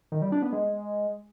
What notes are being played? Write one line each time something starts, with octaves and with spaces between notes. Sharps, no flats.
D#3
G3
D4
B3
G#3